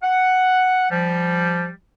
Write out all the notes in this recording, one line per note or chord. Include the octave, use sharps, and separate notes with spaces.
F#5
F3 G3